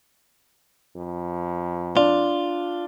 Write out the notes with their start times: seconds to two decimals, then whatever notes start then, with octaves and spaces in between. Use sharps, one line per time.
0.96 F2
1.97 D4 F4